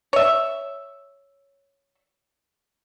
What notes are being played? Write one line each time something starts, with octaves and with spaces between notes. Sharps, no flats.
C#5 E5